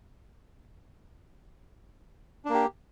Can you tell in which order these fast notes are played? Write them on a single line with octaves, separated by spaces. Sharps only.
D4 A#3 G4